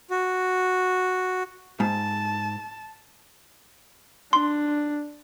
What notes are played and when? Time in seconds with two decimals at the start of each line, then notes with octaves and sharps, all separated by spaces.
0.11 F#4
1.80 G#2 A5
4.33 D4 C6